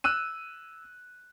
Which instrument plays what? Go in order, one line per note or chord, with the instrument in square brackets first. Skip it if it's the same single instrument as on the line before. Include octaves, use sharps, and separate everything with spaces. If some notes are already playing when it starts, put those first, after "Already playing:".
[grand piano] E6 F#6 D#7